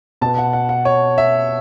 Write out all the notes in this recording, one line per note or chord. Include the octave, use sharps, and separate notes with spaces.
B2 B3 A5
F#5
F#5
F#5
C#5
E5